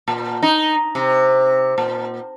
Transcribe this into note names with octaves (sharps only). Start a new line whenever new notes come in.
A#2
D#4
C3
A#2